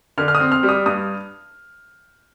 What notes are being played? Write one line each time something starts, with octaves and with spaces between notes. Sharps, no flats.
D3 F6
F6
D#6
C4
F6
G3
D#6
G2 D#6